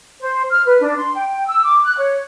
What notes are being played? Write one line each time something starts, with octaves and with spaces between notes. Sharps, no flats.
C5
F6
B4
D4
C6
G5
E6
D6
F#6
C#5